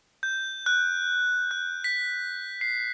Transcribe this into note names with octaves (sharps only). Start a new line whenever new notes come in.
G6
F#6
F#6
B6
C7